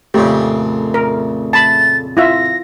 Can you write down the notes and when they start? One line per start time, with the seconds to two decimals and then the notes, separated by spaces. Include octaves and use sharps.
0.14 F2 A#2 C#3 A3 G4
0.94 A#4
1.53 A5 B5 A6
2.17 E4 F4 E5 A#6